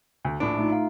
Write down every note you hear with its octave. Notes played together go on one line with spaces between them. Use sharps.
D2
A#1 A2 D4 D7
A3 D#4 F4
F5